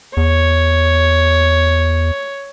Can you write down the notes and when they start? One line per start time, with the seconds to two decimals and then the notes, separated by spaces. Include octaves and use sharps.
0.17 E2 C#5